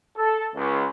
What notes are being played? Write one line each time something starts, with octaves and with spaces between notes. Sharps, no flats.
A4
C#2